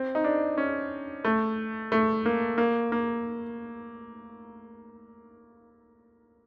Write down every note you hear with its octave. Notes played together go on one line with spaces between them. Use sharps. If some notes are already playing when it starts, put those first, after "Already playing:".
Already playing: C4
D#4
D4
C#4
A3
A3
A#3
A#3
A#3